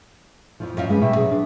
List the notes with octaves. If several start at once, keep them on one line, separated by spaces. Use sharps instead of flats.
F2 G#2 F3
F#2 D#5 F5
G2 G#3 C#4
B2 G3 A3 C4 E5 G5
F#3 G#4
D4